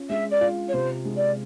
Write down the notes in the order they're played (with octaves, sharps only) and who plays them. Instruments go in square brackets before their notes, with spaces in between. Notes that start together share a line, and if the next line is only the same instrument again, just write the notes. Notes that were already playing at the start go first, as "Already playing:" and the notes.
Already playing: [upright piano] C#4 F4
[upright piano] G#3 [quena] E5
[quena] D5
[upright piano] F4
[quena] C#5
[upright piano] C3 [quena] C5
[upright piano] G#3
[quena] D5